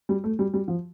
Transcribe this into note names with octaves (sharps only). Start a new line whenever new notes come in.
G3
A3
G3
G3
F3